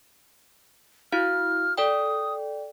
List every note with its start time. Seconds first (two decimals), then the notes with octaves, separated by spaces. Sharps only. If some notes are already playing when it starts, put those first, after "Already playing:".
1.12 E4 F#4 F5 F6
1.78 A4 D5 G5 D#6